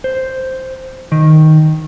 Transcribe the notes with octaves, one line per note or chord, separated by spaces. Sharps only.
C5
D#3